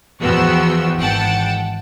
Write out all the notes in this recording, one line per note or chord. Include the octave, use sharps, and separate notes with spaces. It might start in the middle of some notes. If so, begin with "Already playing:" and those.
E2 F3 B3 F#4 G5 E6
G#1 E3 F#5 G5 A5